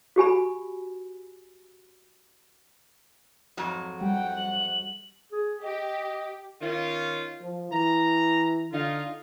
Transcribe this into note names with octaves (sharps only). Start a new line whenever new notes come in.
F#4 G4 G#5 B5
F2 G#2 F#3
G3 F#5 G5
F#7
G#4
G4 D#5
D#3 C#4 F4
F3
E3 A#5
D3 D#4 F4